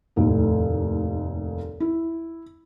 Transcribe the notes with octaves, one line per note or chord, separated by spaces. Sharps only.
F1 D#2 A2
E4